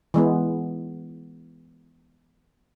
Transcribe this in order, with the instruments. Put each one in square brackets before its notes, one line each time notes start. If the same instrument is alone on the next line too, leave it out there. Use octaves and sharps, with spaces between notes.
[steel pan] E3 G#3 B3